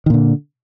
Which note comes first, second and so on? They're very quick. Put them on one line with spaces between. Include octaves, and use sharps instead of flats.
D#3 A#2 D3